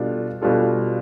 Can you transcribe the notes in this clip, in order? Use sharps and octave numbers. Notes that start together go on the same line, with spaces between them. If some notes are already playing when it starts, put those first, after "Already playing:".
Already playing: B2 G3 D4 F4 A4
B2 G3 D4 F4 A4